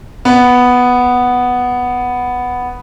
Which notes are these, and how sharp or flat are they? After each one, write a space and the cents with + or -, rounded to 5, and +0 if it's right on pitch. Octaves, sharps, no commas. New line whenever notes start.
B3 +0